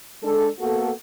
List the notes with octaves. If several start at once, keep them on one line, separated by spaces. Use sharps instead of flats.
G#3 D4 A4
A#3 B3 F#4 A4